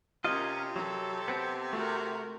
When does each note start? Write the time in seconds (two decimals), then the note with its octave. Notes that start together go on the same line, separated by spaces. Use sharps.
0.24 C3 C#4 F4 A#4 D#5
0.76 F#3 A4
1.28 B3 C4
1.73 A3 F#4 A#4